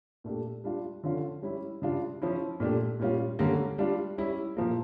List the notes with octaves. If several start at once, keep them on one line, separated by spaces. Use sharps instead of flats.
A#2 A3 D4 G4
G3 D4 F4
D3 F3 C#4 F4
G3 C#4 E4
C#3 G3 D4 F4
F3 C#4 E4
A#2 A3 D4 G4
A#2 G3 C#4 F4
D3 G3 A#3 C#4
G3 D4 F4
G3 C#4 E4
A#2 F3 A#3